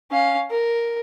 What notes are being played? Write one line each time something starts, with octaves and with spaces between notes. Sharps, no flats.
C#4 F5
A#4